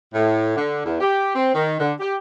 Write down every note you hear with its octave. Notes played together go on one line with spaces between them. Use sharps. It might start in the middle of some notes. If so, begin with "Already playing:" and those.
A2
D3
E2
G4
C4
D#3
D3
G4